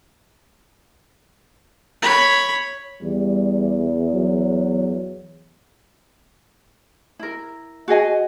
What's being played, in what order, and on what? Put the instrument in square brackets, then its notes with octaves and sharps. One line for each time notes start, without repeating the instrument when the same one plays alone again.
[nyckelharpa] C#5 B5
[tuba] E2 [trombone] G3
[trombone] F#3
[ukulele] E4 A#4
F#4 G#4 D#5 G#5